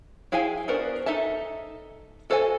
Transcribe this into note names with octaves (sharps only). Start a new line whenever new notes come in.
E4 G#4 F5 G5 G#5
B3 D4 F#4 A#4 C5
D#4 A4 E5 A5
F#4 A4 C5 F5 G#5